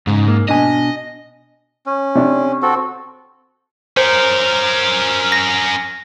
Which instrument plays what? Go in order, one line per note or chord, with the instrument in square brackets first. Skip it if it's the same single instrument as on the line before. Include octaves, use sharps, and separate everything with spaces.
[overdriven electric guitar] G#2 [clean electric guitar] C#3
[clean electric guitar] A#3
[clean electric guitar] B2 D4 G#5 [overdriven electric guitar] D#5
[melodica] C#4
[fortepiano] C3 D4
[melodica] C4 F#4 A4
[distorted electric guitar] C#4 A#4 [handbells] C5
[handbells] A#6